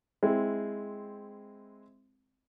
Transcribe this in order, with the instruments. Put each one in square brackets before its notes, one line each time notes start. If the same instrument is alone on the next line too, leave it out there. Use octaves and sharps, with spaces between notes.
[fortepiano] G#3 C4 E4